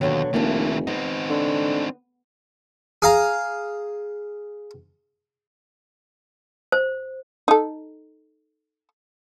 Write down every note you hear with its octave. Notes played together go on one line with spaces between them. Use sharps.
D#2 B2 D3 F#3
F1 D#3 A#3 D4 E4
B3 C4 D#4
D3
G#4 F5 A#5
C5
D#4 A4